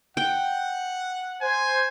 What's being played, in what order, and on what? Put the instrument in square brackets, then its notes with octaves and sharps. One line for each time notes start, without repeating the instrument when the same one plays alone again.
[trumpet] F#5 [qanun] G5
[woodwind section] C5 [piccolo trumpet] G#5